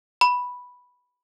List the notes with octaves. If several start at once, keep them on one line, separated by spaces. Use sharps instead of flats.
B5